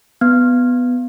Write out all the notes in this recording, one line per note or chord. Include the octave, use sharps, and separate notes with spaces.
B3